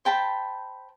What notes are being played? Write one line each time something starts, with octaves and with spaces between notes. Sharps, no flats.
C5 G5 A5 B5